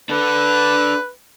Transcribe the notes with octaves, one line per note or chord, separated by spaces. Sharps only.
D4 A4 B4